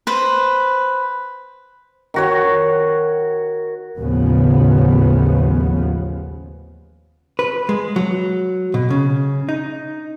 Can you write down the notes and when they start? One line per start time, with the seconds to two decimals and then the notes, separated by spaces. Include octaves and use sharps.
0.07 B4 C5
2.14 D#3 F#4 C#5
3.98 A1 D#2 C#3 F3 B3
7.39 B4
7.69 G#3
7.96 F#3
8.74 B2
8.90 C#3
9.49 D#4